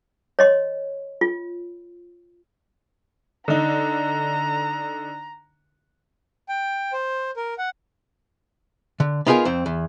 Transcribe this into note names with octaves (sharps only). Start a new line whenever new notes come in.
C#5 D#5 C6
F4
D3 D#4 A#5
G5
C5
A#4
F#5
D3
B3 D#4 F4 F#4 G#4 A#4
F2 C4
E2